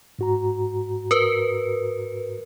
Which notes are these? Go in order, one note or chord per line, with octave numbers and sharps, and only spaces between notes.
G#2 F#4 A#5
A#4 B4